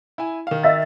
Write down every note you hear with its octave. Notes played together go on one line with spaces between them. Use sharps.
E4 G#5
D#3 F5
D#5 E5 A6